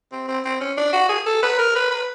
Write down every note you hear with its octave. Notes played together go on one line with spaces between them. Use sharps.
C4
C4
C4
C#4
D4
F#4
G#4
A4
B4
A#4
B4
B4